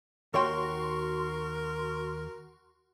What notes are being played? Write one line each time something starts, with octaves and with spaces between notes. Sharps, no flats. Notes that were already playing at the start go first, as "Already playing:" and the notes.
D#2 F#4 A#4 C#5 G5 C6 C#6